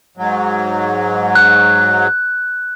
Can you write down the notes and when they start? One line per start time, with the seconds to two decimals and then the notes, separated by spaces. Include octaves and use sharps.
0.17 G#2 F#3
1.35 F#6